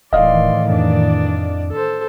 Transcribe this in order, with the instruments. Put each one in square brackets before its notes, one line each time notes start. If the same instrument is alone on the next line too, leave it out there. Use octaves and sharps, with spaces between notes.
[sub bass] D1 [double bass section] A2 D#3 E3 [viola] D5 C6 [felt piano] D#5 F5
[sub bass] F2 [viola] D4 D5
[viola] A4 C5